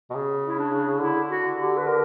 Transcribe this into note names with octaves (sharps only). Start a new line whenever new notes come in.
B2
C#3
E4
D4
D3 E4
F#4
G4
B4
A#4